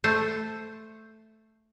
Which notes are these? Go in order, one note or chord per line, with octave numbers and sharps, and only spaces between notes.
A3 C5